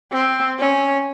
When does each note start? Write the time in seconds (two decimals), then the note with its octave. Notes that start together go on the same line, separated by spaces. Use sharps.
0.12 C4
0.59 C#4